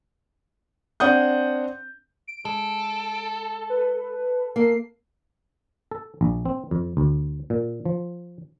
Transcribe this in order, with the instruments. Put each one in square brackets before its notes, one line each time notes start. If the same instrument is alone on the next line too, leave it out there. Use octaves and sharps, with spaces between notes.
[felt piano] C4 D4 F#5 D#6 G6
[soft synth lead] D7
[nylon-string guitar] G#3 [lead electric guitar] A4
[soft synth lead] B4
[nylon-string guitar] A#3 A4 [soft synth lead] C7
[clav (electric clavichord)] A4
A#1
C4
F2
D2
A#2
F3